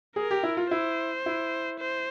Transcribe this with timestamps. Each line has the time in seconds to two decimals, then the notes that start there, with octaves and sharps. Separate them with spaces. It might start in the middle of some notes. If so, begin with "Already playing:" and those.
0.16 G#4 A#4
0.31 G4
0.43 E4
0.57 F4
0.71 E4 C5
1.26 E4
1.80 C5